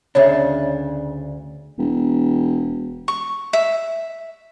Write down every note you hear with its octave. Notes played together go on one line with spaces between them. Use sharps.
D2 C#3 D4 C#5 E5
E1
C#6
E5